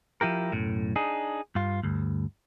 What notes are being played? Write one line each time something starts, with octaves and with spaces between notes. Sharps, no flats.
F3 E4 G4 A#4
B1 F#2 A2
D4 D#4 G#4
G2 F4
D2 G2